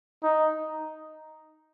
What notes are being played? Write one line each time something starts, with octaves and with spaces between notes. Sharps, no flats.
D#4